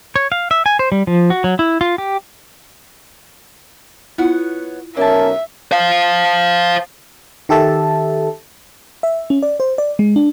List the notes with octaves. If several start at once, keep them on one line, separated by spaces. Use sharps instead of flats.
C#5
F5
E5
G#5
C5
G3
F3
F#4
F#3
E4
F4
G4
B3 E4 F4 C#5 F#5
B1 A#3 C#4 A#4 E5 A5
C5 F5
D#3 G4 A4 E5 A5
E5
C#4
D5
C5
D5
G#3
D4